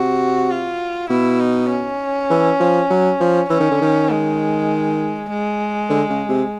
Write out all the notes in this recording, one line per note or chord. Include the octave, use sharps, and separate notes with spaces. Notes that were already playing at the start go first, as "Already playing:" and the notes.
Already playing: C3 F#4
F4
B2 E4
D#4
C#4
E3
F3
F#3
F3
E3 C#4
D#3
D3
D#3
G#3
G#3
D3
C#3
C3